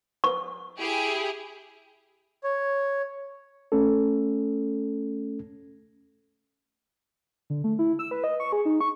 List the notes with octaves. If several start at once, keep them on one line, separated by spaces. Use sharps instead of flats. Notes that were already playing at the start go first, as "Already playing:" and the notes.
C#6
E4 G4 G#4
C#5
A3 C#4 A4
D3
A3
E4
E6
B4
D#5
C#6
G#4
D#4
C#6